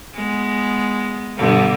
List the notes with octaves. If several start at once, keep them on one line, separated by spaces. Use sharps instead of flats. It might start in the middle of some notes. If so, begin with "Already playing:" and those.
G#3 B3
G2 B2 D3